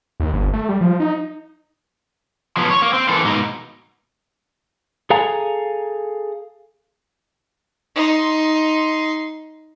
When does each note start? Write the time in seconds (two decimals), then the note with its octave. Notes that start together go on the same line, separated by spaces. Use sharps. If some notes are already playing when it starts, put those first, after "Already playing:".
0.20 D#2
0.33 G1
0.53 A3
0.69 G3
0.81 F3
1.00 D#4
2.57 F3 F#3 B3
2.70 C#5
2.82 A#3
2.93 C4
3.09 E3 A#3 A4
3.25 G#2 B2 A#3 D#4
5.10 G#4 A4 F5 G#5 A#5
7.95 D#4 C6